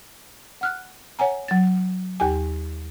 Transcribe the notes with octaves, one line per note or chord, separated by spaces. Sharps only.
F#5 F6 F#6
C#5 F#5 G#5 A#5
F#3 A6
D#2 G4 G#5